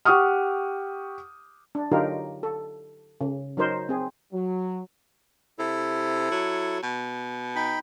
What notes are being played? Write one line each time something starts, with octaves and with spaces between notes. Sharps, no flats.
G4 F#5 C#6 D#6 F6
D4
D3 F#3 D#4 F4 G4 A#4
A4
C#3
F#3 D#4 A#4 C5
C4 G#4
F#3
C3 E4 A4
F#3
B2
D#4 G5 B5